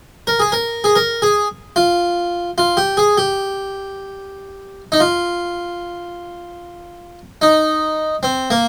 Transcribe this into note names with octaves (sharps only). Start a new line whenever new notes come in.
A#4
G#4
A#4
G#4
A#4
G#4
F4
F4
G4
G#4
G4
D#4
F4
D#4
C4
A#3